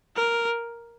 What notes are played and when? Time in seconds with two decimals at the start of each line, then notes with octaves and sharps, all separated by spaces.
0.16 A#4